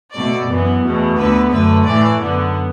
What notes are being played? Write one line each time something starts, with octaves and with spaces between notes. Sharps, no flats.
B2 A3 D5
F#2 E3 B3
E2 B2 A3
D2 D3 B3 B4
F#2 D3 A3 B4
A2 E3 A3 D5
F#2 D3 B3